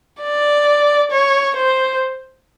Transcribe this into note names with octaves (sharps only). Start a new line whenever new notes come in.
D5
C#5
C5